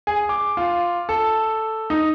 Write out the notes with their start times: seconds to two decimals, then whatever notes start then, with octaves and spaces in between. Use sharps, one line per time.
0.07 G#4
0.29 D6
0.57 F4
1.09 A4
1.90 D#4